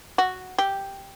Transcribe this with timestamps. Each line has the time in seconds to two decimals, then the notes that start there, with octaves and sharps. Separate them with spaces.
0.18 F#4
0.58 G4